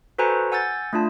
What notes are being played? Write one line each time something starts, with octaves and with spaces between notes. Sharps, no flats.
F#4 A4 B4 C5 G#5 A#5
F#5 G#5 E6 G6 A6
A3 D4 F4 A5